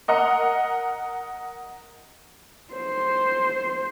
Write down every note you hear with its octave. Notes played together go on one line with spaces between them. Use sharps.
A#4 D#5 F#5 A#5
C5